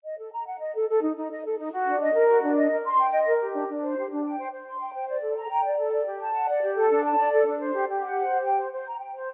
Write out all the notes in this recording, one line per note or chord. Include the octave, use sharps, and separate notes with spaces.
D#5
A4
A#5
F#5
D#5
A4
A4
D#4
D#4
D#5
A4
D#4
F#4
D4
D#5
A#4
F#4
D4
D#5
A#4
C6
G5
D#5
A#4
G4
D4
D4
C5
G4
D4
G5
C5
C5
C6
G5
C5
D5
A4
A#5
G5
D5
A4
D5
G4
A5
F#5
D5
G4
A4
D4
A5
D5
A4
D4
C5
G4
G4
F#5
C5
G4
G5
C5
C5
A#5
G5
C5